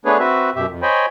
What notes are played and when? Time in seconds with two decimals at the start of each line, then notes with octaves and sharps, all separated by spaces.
0.06 A3 B3 D4 G#4 B4 C#5
0.19 C4 F#4 B4 E5
0.56 F#2 B2 G4 E5
0.67 F2
0.82 C5 C#5 D#5 G5 G#5 B5